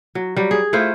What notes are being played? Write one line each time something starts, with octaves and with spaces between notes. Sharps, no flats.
F#3
F#3 G3
G#4
A3 E4 F4 C5